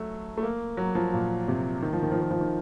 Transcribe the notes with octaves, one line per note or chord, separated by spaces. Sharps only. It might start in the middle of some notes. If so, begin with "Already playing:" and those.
Already playing: F#3 A3
A3
A#3
F#3
F3
A#2
C3
D#3
F3
D#3
F3
D#3
F3
D#3